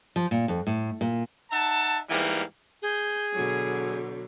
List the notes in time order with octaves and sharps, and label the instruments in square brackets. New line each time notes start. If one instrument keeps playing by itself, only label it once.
[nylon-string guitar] F3
A#2
F2
A2
A#2
[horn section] D#4 E5 F#5 A5
G#2 E3 G3 A#3 B3 G4
[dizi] G#4 [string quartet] G6
[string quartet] B2 D3 F#3